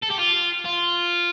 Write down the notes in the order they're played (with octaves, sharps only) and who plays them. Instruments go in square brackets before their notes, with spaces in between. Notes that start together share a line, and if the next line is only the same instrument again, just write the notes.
[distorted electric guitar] A4
G4
F4
F4